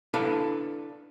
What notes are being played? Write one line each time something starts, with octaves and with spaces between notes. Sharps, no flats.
D4 E4 A4 B4 F5